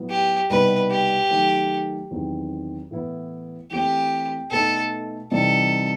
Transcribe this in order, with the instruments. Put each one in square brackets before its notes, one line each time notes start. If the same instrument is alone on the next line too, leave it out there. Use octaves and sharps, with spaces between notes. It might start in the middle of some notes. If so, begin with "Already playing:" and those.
Already playing: [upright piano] A2 F#3 B3
[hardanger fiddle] G4
[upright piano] C2 B2 G3 B3 D#4 [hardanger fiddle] B4
[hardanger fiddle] G4
[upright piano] D#3 F#3 A3
E2 D#3 F#3 C4
A2 E3 B3 E4
[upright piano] E3 A3 C4 [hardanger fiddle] G4
[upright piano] B2 A3 D#4 [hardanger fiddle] A4
[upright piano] C3 E3 G3 C4 D#4 [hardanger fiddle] A4